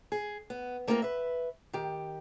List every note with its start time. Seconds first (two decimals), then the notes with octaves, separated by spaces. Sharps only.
0.12 G#4
0.50 B3
0.87 A3 A#3 C4 F4 A4 A#4
1.02 B4 E5
1.73 D#3 G4